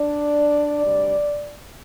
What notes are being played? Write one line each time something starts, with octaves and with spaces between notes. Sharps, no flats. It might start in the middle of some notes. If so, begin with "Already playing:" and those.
Already playing: D4 D5
D2 C3 G3 D4